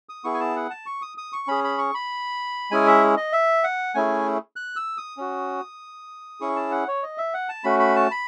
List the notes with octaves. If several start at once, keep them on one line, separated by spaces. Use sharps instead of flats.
D#6
B3 E4 G#4 C#6
G#5
A5
F#5
A5
C#6
D#6
D#6
C#6
C#4 G#4 B5
B5
C#6
B5
G#3 C#4 E4 G#4 G#5
E5
D#5
E5
F#5
A3 C#4 E4 G#4 G#5
F#6
E6
D#6
C#4 F#4
C#4 E4 G#4 C#6
A5
F#5
C#5
D#5
E5
F#5
A5
A3 C#4 F#4 B5
B5
A5
B5